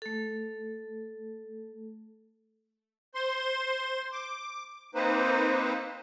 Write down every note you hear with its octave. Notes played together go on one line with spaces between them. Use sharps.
A3 A4
C5 C6
D6
A#3 C4 D#4 B4 C5